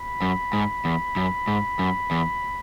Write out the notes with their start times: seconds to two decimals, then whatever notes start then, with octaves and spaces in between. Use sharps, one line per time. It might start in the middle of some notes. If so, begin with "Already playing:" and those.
Already playing: B5
0.22 F#2
0.53 G#2
0.85 E2
1.16 F#2
1.48 G#2
1.79 F#2
2.11 E2